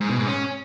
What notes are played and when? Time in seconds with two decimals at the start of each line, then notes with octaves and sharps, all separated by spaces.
0.01 G#2
0.10 B2
0.18 G#2
0.27 C#4